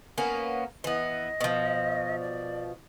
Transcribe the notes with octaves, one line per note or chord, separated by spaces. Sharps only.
A#3 B3 C#4
E3 B3 D#5
B2 F3
D5